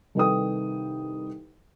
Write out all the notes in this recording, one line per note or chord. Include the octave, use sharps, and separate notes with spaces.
C2 D#3 A4 B4 G5 D#6